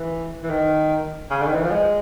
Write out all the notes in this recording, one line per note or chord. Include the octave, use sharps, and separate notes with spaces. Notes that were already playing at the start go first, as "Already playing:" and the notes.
Already playing: E3
E3
D#3
C#3
D3
D#3
E3
F3
G#3